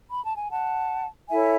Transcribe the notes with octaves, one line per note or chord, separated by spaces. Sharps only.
B5
A5
G#5
F#5 A5
E4 A4 C#5 E5 G#5